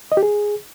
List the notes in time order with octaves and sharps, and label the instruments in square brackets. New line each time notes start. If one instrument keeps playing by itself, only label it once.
[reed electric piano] D#5
G4
G#4